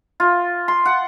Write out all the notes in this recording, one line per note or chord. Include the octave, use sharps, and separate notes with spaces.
F4
C6
F#5